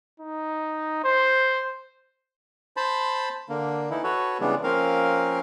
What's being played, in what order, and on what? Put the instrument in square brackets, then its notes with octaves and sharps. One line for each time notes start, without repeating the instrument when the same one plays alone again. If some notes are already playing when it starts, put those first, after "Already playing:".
[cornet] D#4
C5
[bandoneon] C5 A5 B5
D3 A#3
E3 D#4 E4
F#4 A4 B4 C#5
C#3 E3 G3 G#3 B3 D4
F3 A#3 C4 C#4 A#4 F5